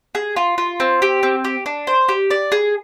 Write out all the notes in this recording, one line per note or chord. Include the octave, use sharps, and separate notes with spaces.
G#4
F4
F4
C4
G4
C4
G4
D4
C5
G4
D5
G#4